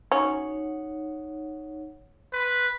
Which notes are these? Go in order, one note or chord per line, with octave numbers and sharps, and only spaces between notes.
F#3 C#4 D#4 C#5 F#5
B4 C6